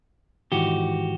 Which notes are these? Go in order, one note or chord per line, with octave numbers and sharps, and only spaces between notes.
G#2 D#3 E3 F#4 G4